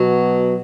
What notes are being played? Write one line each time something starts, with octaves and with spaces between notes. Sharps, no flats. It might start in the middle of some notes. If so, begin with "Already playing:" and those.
Already playing: B2 F#3